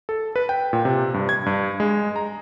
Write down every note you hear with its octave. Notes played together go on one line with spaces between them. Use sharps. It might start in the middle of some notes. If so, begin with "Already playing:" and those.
A4
B4
G5
A#2
C3
G2
G#6
G2
G#3
A#5